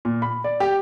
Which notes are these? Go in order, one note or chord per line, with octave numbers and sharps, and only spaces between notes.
A#2
B5
D5
G4